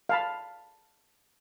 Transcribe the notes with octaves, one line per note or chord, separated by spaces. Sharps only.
F5 A5 B5